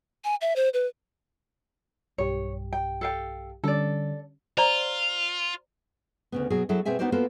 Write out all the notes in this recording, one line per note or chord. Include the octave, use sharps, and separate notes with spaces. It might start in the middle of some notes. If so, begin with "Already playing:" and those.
G#5
E5
C5
B4
B1 G2 G4 C#5
G5
A4 F5 G5
D3 G3 C#4 A4 D5
F4 C5 D5 A#5
D2 C#3 B3
B2 F#3 G#4
F#3 E4 G#4 A4
B2 C4 G#4 E5 G#5
B3 D#4 F#4 A#4 C5 D5
A#3 B3 F4 F#4 A4 C5